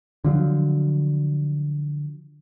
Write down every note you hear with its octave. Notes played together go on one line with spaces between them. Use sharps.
D3 F3 F#3